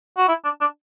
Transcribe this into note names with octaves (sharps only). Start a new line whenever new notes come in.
F#4
E4
D4
D4